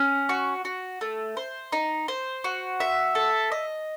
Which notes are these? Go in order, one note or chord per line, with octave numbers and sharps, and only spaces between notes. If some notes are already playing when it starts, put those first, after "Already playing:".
Already playing: C#4
F#4
F#4
A3
C5
D#4
C5
F#4
E5
A4
D#5